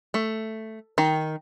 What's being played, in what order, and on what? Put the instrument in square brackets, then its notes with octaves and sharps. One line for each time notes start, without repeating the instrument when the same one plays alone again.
[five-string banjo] A3
D#3